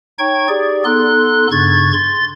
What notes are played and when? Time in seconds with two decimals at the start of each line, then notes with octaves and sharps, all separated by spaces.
0.19 D#4 C#5 G5 C#6 G#6
0.48 G4 G#4 D5
0.84 B3 D#4 A4 C6 F#6
1.51 G2 C#3 C#6 G#6 A6
1.93 C6 A6